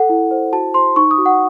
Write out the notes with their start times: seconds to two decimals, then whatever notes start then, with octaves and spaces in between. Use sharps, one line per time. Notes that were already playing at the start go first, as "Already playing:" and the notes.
Already playing: A4 F#5
0.09 E4
0.31 C5
0.53 F#4 A5
0.74 C5 C6
0.96 D#4 C#6
1.11 D#6
1.18 F#4
1.26 F#5